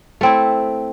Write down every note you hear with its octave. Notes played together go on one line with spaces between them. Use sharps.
A3 C4 E4